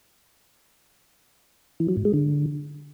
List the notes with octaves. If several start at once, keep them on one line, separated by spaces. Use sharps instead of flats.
E3
F#3
G#2
G#3
D3